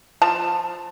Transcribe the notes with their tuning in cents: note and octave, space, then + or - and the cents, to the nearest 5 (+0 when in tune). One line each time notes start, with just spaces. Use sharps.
F3 +0 A5 +15